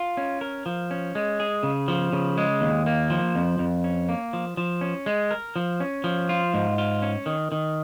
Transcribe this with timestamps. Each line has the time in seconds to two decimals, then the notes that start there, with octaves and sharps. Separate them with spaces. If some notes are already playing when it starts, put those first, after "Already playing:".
Already playing: F4
0.17 C#4
0.41 A#4
0.66 F3
0.91 C#4
1.15 G#3
1.40 G#4
1.63 C#3
1.88 F3
2.13 C#3
2.37 G#3
2.61 D#2
2.86 A#3
3.10 F3
3.35 F2
3.59 F2
3.84 C#4
4.09 A#3
4.33 F3
4.57 F3
4.81 C#4
5.06 G#3
5.31 A#4
5.56 F3
5.80 C#4
6.04 F3
6.29 F4
6.54 G#2
6.78 F4
7.02 C#4
7.26 D#3
7.52 D#3